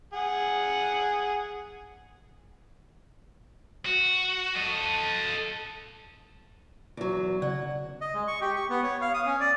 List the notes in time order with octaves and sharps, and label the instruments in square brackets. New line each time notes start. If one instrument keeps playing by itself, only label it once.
[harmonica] G#4 F#5
[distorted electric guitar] F#4
A4 D#5
[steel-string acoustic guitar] E2 F#3
[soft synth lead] C#3 [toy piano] D5 [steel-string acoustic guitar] F#5
[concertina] D#5
G#3
C#6
G4
C#6
B3
C#5
F5
D#6
C#4
D5